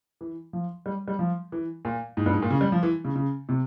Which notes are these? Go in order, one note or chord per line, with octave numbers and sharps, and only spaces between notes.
E3
F3
G3
G3
F3
E3
A#2
G#2
G2
G#2
A#2
C#3
G3
F3
E3
C#3
C#3
C3